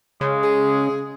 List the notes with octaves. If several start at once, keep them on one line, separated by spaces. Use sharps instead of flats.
C#3 G#3
G#4